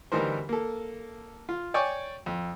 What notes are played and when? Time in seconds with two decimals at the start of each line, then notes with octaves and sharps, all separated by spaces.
0.12 D2 E3 G3 D#4 A#4 C5
0.49 A#3 A4
1.49 F4
1.74 C#5 D5 G5 G#5 C#6 D6
2.26 F2